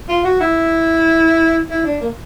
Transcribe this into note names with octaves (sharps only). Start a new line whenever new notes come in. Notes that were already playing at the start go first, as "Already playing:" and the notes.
F4
F#4
E4
E4
D4
A#3